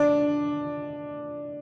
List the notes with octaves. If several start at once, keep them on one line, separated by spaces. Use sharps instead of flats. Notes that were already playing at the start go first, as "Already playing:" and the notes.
Already playing: D4